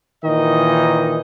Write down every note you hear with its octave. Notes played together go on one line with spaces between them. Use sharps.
A#2 D#3 E3 D#4 D#5